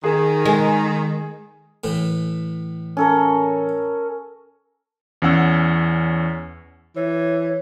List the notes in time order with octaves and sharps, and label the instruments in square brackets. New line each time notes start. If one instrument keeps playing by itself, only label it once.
[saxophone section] D#3 [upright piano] G#4
[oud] G#3
[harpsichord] A2 E3
[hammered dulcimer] C#4 A4 A#4
[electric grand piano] E2 C#4 F#5 E6
[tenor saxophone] E3 [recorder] C#5